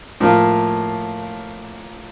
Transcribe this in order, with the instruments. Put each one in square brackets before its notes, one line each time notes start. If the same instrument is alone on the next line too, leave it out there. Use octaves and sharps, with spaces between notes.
[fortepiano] A2 F3 A#3 F4